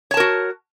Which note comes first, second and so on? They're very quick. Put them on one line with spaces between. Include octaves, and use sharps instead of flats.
C#5 A5 A#4 F#4